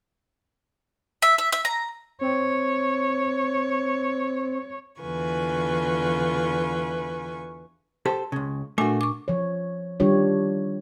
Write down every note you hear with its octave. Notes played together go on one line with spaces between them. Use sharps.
E5
E5
E5
A#5
C4 C#5
E2 D3 F4 B4 G#5 C#6
G4 A4 C5 A5
C#2 C#3
A#2 A3 D4 F#4 G#5
C#6 D6
F3 C#5
D#3 G3 D4 F4 G4 C#5